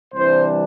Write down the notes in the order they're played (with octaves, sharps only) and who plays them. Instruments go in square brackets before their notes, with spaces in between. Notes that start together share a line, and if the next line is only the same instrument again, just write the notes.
[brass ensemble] C2 C3 E3 G3 D4 C5